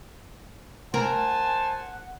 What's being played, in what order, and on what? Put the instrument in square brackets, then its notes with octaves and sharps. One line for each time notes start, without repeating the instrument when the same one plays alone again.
[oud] A#4 [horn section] C5 G#5 A5 [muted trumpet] F#5